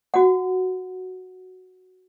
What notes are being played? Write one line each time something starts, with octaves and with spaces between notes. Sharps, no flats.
F#4 F#5